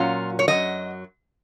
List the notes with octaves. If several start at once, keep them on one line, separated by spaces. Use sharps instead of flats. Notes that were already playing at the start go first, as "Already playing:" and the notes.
Already playing: A#2 F#3 C#4 F4
C#5
F#2 D#3 F#3 D#5